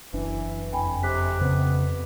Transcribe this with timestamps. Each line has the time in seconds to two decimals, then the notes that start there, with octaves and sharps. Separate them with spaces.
0.14 F#1 E3 D4
0.72 F2 G5 G#5 B5
1.03 C3 D6 F#6 B6
1.41 C#3 B3